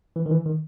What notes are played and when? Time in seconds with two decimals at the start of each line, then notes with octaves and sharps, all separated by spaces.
0.16 E3
0.26 D#3
0.31 E3
0.46 D#3